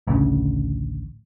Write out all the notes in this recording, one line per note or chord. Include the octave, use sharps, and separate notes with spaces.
A1 D2 C#3